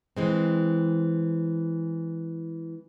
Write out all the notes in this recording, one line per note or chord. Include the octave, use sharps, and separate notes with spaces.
E3 G#3 C4